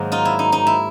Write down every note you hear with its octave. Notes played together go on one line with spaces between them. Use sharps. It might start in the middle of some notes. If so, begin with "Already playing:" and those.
Already playing: G#2 D#3 F#3 A#3
D#4 F4
E4
D#4
D#4
E4